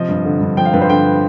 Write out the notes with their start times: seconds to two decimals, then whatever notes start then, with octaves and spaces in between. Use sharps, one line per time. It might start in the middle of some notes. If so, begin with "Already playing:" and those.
Already playing: C3 F3 D#5
0.08 G2
0.25 D3
0.40 G2
0.57 F3 G5
0.65 F5
0.73 G2 B4
0.82 C5
0.90 D3 G5